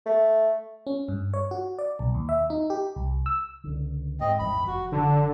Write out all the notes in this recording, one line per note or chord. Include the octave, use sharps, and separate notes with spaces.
A3
C#4
G2
C#5
F#4
D5
B1
D#2
E5
D#4
G4
C2
E6
C#2 D3
G#2 C4 D#5
A1 E2 G2 B5
F1 F#4
D3 D4